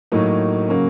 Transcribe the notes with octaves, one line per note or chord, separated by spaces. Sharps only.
A2 F#3 A#3 D#4
C#3 F#3 A#3 C#4